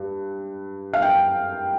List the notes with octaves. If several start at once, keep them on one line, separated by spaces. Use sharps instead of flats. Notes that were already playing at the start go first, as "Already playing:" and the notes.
Already playing: G2
F5
G5